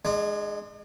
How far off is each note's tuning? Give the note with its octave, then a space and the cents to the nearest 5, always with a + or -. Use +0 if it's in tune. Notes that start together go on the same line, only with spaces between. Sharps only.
G#3 +0 D4 +45